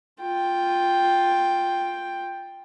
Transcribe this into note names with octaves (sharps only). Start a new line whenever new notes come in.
F4 G5